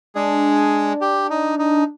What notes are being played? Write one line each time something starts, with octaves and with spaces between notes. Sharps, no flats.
G#3 D4 G#4
G4
D#4
D#4